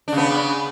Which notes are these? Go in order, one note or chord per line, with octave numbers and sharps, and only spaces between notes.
C#3 B3 D4